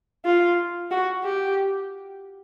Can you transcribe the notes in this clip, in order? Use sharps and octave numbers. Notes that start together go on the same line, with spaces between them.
F4
F#4
G4